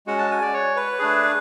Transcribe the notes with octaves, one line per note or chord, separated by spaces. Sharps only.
G#3 C#4 F#4 F#5
A5
G#5
D5
C#5
B4
A3 D4 G#4